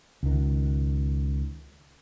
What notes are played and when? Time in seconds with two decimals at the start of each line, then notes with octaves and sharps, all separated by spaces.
0.23 C#2 D#3